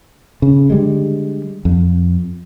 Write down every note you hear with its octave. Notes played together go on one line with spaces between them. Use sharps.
C#3
D3 G3 G#3
F2